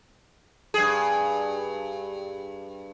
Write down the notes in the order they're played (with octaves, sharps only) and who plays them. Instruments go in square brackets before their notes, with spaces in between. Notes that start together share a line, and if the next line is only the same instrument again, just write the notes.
[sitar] G2 G#4